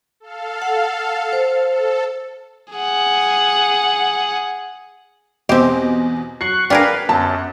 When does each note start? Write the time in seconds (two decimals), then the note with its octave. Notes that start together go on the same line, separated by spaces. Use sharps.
0.20 A4 F5
0.62 F#5
1.33 C5
1.70 A4
2.73 G#4 F#5
5.49 E2 B2 C4 G4 D#5
6.41 F#3 C#6 F#6 C7
6.70 D4 G#4 A#4 B4 F5 G5
7.09 G1 F#2 A5